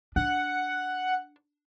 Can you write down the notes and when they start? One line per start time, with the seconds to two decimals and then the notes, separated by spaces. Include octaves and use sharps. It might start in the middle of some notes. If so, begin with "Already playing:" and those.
0.16 D4 F#5